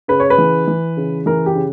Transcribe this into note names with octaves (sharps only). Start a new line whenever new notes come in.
C#3 B4
C#5
B4
E3
E3
C#3
E3 A#4
G4
C#3